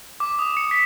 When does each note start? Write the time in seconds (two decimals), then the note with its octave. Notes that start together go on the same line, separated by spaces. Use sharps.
0.20 D6
0.39 D#6
0.57 C#7
0.71 B6